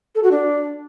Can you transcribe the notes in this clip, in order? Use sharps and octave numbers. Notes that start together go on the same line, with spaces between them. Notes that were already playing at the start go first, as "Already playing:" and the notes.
A4
F#4
D4